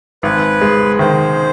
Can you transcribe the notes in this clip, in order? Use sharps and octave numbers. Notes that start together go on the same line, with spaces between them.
G#1 B4
G#3
D#3 C5